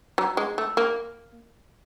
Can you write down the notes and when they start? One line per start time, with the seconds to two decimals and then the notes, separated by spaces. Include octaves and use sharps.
0.18 F#3
0.37 G#3
0.58 A3
0.77 A#3